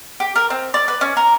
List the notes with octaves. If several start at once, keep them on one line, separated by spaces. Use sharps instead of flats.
G4
A#4
C4
D5
B4
C#4
A#4